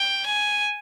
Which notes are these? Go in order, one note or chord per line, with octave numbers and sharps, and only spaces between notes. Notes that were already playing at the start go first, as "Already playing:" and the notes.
Already playing: G5
G#5